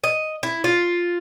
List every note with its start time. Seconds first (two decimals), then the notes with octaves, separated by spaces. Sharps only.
0.04 D#5
0.43 E4
0.64 F4